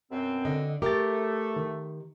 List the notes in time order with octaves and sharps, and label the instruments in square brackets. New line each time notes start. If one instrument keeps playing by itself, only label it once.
[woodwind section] F#2 B2 C4
[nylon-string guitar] D3 [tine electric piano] D#5
[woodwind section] A3 [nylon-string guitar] G4 A#4 [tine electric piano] D6 A6
[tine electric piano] D#3